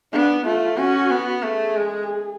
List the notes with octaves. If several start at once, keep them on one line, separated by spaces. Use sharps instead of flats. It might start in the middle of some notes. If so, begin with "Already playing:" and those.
B3 D4
A3 F4
C#4 F#4
B3
A3 G#4
G#3